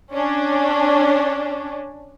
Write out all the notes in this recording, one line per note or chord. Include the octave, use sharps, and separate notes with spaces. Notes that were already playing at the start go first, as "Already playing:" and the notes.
C#4 D4